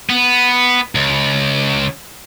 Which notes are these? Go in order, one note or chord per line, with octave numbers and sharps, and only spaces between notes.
B3
C#2